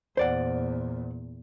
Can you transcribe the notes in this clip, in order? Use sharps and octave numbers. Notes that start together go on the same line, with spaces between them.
E2 A#2 C5 D5 F#5